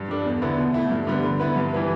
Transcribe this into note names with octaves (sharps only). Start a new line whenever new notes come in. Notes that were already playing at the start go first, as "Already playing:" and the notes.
Already playing: G2
G3 D4 A4
E2
D3 B3 E4 A4
B2
A3 E4
G2
D3 G3 B3
D3
B3 E4 B4
G2
E3 G3 E4 B4